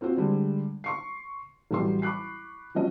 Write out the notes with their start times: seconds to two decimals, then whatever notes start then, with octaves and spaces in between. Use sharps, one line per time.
0.01 C4 F4 F#4 C5
0.17 D3 G3 G#3
0.84 C6 C#6 C7
1.71 A1 F#3 G3 B4 C6
2.02 B5 C#6 D6 F#6 C7
2.75 F3 F#3 C#4 D#5